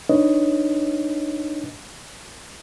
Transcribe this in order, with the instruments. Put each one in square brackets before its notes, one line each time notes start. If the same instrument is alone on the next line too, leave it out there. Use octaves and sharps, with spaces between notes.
[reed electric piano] D4 D#4 B4 C#5 D#5